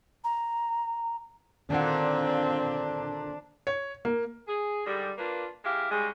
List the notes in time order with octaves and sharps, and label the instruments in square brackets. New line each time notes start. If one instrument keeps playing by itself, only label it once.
[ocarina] A#5
[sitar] A#2 D3 [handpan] D#3 F#5 [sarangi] C4 [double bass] D4
[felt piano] C#5
A#3
[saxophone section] G#4
G#2 D3 G3
A#3 D4 F4 B4
G#3 E4 G4 F5
G#2 C#3 G3 G#3